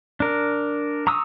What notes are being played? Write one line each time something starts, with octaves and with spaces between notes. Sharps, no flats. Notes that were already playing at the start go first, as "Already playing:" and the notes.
D4 A#4
A#5 C#6 D#6 E6